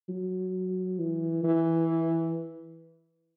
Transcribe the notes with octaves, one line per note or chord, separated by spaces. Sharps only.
F#3
E3
E3